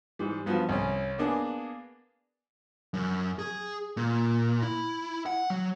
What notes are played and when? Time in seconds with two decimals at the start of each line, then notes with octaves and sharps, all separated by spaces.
0.19 G#2 E3 G3
0.46 G2 F3 B3 F#4
0.69 C2 C#4
1.18 A#3 B3 D4 G#4
2.94 F#2
3.39 G#4
3.97 A#2
4.62 E4
5.26 F#5
5.50 F#3